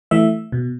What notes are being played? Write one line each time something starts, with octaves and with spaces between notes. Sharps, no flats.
E3 A3 E5
B2